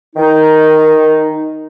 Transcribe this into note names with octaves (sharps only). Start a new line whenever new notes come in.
D#3 D#4